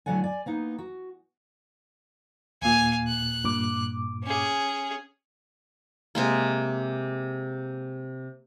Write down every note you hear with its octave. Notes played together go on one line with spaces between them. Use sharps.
A2 D3 F#3 D5 F#5 G#5
D5 G#5
A#3 B3 D#4
F#4
D#2 A#2 F5 G#5
F#6
G2 A#2 D6
C#4 G#4
C3 G#3 A#3